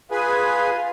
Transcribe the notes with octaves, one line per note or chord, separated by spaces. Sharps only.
F4 G#4 B4 G#5